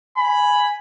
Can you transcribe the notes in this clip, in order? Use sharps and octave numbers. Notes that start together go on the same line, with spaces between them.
G#5 B5